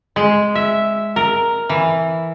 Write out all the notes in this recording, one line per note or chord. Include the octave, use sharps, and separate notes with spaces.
G#3
E5
A#4
E3